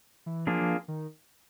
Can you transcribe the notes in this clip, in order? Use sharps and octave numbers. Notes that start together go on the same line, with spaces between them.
E3
F3 A#3 D4 F4 G#4
F3
D#3